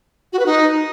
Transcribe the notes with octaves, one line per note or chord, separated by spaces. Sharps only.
F#4
B4
D#4